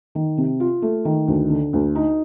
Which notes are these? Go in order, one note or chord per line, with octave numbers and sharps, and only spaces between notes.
D#3
C3
F4
A3
D#3
D2
D3
D2
D#4